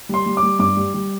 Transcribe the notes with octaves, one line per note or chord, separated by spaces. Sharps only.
G3 C6
G3
D6
G3
G2 D6
G3
G3